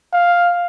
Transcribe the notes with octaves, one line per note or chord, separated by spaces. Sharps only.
F5